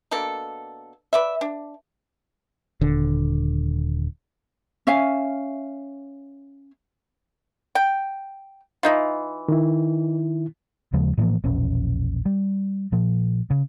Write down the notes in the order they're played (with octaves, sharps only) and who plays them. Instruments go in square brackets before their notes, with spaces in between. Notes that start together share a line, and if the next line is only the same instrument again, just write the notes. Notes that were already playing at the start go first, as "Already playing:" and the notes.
[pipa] B2 A#3 D4 A4
B4 D5 E5
D4
[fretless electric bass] D#1 D3
[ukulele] C#4 E5 F5 G#5
[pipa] G5
E3 D#4 F4
[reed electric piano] D#3 E4
[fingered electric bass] D#2 C#3 F3 G#3
A2 E3 F3 A#3
E1 A#1 C#4
G3
A#2 F3
C#3